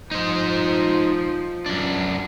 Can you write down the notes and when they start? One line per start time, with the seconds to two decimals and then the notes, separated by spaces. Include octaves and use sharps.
0.11 F3 D#4 C5
1.66 F#2 D4